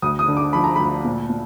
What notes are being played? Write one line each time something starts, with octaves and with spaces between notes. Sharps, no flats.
D2 D#6
D#6
D3
D6
F3 B5
A#5
D2 B5
A#2
A#2